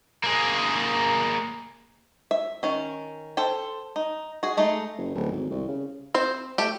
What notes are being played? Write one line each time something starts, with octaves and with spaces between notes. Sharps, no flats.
A#3 G#4
E5
D#3 C#4
A4 C5 G5
D#4
F#4 G#4
G#3 A3 D#4
F#1
D1
G#1
C2
C#3
C4 C5
A3 G4